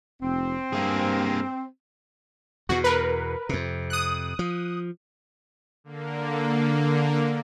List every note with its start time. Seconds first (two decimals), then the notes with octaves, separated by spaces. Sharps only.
0.22 F1 C4
0.73 G2 A#3 G#4
2.69 E2 B2 F#4
2.84 A#4 B4
3.49 F2 C3
3.90 D#6 F#6
4.39 F3
5.84 D3 A#3